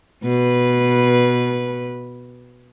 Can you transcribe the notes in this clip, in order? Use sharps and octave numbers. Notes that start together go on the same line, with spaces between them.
B2 B4